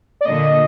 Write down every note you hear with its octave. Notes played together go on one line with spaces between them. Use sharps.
D5
A#2 D3 D#5